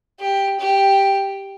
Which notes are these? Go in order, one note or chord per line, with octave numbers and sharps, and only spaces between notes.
G4
G4